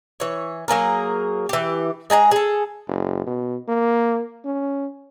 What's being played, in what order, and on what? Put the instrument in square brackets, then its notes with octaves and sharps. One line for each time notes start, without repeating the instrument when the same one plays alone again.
[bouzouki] E3 C#5
F#3 A#3 G#4 A#4
E3 G4
G#3 G#4 A5 A#5
G#4 A4
[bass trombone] F#1
B2
A#3
C#4